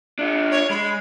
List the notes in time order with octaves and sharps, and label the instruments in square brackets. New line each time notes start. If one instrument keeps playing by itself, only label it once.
[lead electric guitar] D4 F4
[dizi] C#5
[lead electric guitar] G#3 [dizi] B5